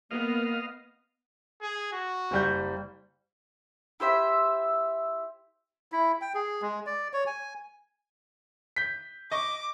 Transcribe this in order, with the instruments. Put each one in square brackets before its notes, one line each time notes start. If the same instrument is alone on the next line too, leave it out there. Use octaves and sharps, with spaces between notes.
[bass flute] A#3 [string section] B3 [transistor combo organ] D#5 F5
[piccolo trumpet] G#4
F#4
[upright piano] F#1 G3 G6
[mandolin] E4 G4 C5 E5
[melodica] E4
G5
G#4
G#3
D5
C#5
G#5
[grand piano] G6 B6
[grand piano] D#5 C#6 [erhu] D6